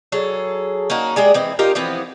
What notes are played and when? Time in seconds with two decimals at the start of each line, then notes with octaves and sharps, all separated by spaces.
0.12 F#3 G#4 A4
0.90 A#3 C#4 D#4 F#4
1.16 G#3 G4 G#4 D5
1.34 E3 C4 D#5
1.59 D#4 F4 G4 A#4
1.75 E3 F3 B3 C4